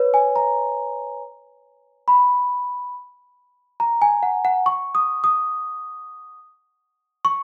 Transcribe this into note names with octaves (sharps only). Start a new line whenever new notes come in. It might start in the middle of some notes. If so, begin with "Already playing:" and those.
Already playing: B4 C#5
G#5
A#5
B5
A#5
G#5
F#5
F#5
C#6
D#6
D#6
C#6